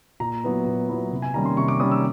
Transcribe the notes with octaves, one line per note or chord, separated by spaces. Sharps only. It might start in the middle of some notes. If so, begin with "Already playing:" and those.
A#2 A#5
F#3 B3 E4
A#2
F#3 B3 E4
C3
G#5
D#3 G3 A#3 C#4 A#5
C6
C3 C#6
D6
D#3 G3 A#3 C#4 D#6
E6